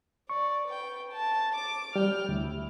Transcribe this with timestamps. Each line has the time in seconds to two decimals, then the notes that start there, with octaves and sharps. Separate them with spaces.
0.30 D5 C#6
0.68 B4 G5
1.12 A5
1.56 D6 D7
1.96 G3 G5 F6
2.29 D2 E4